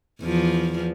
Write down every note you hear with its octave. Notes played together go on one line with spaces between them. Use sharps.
E2 F3